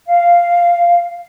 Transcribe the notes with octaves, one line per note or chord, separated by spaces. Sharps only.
F5